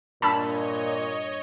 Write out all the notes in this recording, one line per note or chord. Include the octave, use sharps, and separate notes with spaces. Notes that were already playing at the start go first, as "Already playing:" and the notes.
G2 A#2 C#5 D#5 A5 B5 E6